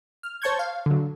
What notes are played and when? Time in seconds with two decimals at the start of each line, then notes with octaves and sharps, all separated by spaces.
0.23 F6
0.42 C5 C#5 A5 C#6 G6 G#6
0.59 F5
0.86 D3 F#3